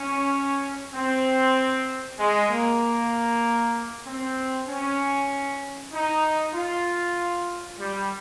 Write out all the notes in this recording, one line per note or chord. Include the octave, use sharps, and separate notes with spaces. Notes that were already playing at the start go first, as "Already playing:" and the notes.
Already playing: C#4
C4
G#3
A#3
C4
C#4
D#4
F4
G3